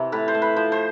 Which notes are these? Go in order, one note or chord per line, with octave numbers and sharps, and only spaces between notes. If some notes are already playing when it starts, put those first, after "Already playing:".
Already playing: C3 E3
A2 B4
C5
A3
B4
F3 C5
C5